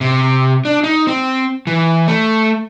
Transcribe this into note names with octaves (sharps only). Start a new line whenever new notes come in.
C3
D4
D#4
C4
E3
A3